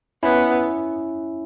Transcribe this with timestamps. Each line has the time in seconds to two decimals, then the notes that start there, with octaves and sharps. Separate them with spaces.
0.23 B3 C#4 E4